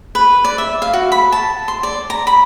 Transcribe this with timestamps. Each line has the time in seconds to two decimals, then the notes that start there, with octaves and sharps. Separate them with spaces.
0.15 B4
0.45 D5
0.58 E5
0.82 F5
0.93 F#4
1.12 B5
1.32 A5
1.68 C6
1.83 D5
2.10 A#5
2.27 B5